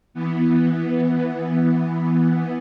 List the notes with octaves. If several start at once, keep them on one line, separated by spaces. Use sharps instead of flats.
E3 B3